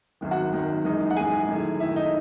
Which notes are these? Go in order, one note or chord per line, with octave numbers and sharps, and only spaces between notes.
G#1 F#2 D#3
F#4 F#5
G#1 F#2 D#3
F#2 E3 G#3 D#4
F#5
F#2 E3 G#3 D#4 G#4 G#5
F#2 D#3 A3 E4
F#2 D#3 A3 E4 E5
D#4 D#5